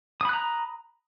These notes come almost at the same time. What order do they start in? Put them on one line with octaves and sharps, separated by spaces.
D#6 B5 F#6 A#5